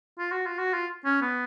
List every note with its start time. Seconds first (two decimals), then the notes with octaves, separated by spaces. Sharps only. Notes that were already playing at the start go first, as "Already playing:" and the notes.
0.18 F4
0.32 F#4
0.46 F4
0.59 F#4
0.73 F4
1.05 C#4
1.21 B3